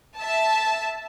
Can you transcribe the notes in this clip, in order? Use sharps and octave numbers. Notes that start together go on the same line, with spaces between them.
E5 A5